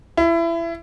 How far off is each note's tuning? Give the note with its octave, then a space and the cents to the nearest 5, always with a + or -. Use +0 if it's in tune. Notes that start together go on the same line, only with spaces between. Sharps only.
E4 +25